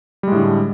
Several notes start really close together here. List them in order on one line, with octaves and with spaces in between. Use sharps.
G3 G#3 A2 D3